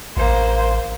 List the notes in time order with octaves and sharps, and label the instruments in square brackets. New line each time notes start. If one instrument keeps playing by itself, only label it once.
[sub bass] A1 [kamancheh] A#3 C5